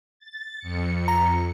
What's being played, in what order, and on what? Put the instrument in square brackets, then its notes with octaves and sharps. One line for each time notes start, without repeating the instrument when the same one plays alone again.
[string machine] A6
F2 C#7
[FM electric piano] A#5